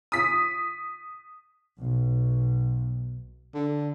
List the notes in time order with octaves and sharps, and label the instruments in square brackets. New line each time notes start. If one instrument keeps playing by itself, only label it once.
[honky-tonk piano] D#6 B6
[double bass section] B1
[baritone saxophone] D3